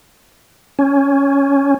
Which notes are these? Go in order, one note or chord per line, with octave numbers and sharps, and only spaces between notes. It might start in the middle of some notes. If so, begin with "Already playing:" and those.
C#4